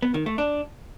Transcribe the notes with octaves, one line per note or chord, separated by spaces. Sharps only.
B3
D#3
A3
D4